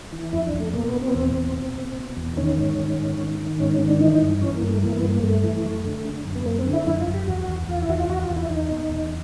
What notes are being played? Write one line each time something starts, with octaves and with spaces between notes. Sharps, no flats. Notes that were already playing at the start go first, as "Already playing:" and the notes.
E3
F2 E4
D4
F2
A3
B2 A#3
B3
B2
C4
B3
E2 C4
B2
B2
B2
B2
E2
D#3 C#4
G#2
D#3
G#2
D#3
D#3
G#2 C#4
C#4
D#3
D4
E3 D#4
G2
E3 C#4
A#3
G2
A3
E3 A#3
B3
G2
A#3
G2 A3
E3
F#2
D3
D3
F#2
B3
F#2 A#3
C4
D3
E4
F#2 E4
F4
F#2
G4
E2 F#4
E2
E2 F4
E4
E2 F#4
F4
E2 F#4
F4
E2
E4
E2 D#4
B2
E2